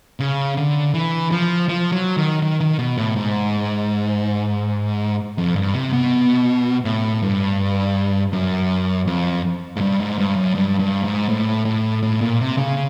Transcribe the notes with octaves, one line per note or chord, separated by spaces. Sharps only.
C#3
D3
E3
F3
F3
F#3
D#3
D#3
D#3
B2
A2
G#2
F2
G2
C3
B2
A2
G2
F#2
F2
G#2
G2
G#2
G2
F#2
G2
G2
G#2
A2
A2
A2
A#2
C3
C#3